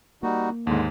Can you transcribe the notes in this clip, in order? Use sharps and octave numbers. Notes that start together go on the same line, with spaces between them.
G3 A#3 D#4 F#4
D#2 G#2 D3 G#3